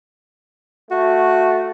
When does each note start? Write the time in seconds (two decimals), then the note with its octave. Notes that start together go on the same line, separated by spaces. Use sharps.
0.91 A3 F#4